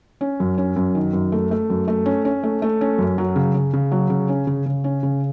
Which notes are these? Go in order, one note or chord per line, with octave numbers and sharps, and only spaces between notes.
C#4
F#2
C#4
F#2
D#3
F#2
A3
A3
F#2
A3
C#4
C#4
A3
A3
C#4
F#2
F#3
C#3
C#3
C#3
F#3
C#3
C#4
C#3
C#3
C#4
C#3